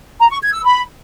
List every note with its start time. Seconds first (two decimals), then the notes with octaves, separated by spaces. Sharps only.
0.19 A#5
0.30 C#6
0.41 G#6
0.52 E6
0.64 B5